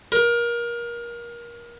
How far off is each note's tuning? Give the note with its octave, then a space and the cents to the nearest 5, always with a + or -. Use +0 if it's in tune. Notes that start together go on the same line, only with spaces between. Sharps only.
A#4 +25